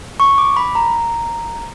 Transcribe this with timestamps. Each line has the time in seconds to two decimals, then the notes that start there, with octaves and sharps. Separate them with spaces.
0.20 C#6
0.38 D6
0.57 B5
0.75 A#5